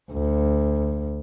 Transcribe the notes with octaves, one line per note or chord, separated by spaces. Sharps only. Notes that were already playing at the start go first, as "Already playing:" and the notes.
D2